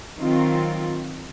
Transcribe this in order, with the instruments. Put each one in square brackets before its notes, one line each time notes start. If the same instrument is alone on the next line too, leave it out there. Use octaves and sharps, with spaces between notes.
[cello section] D#3 F#3 C4 F4